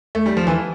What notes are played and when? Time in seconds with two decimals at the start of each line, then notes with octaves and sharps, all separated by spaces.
0.15 A3
0.26 G3
0.37 F3
0.47 E3